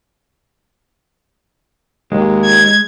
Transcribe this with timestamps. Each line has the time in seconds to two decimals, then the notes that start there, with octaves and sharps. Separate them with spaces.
2.12 D#2 G#3
2.45 G#6